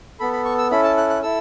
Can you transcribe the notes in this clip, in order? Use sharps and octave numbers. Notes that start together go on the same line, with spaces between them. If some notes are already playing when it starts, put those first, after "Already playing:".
B3 A4 B5
B5
C#6
E6
C#4 E4 A4 B5
A5
F#6
F#6
E4 A4 E6